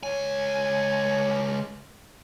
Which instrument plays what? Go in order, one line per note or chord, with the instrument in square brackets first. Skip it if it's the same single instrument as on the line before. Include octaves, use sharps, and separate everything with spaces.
[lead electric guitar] C#2 G#5 [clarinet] C#5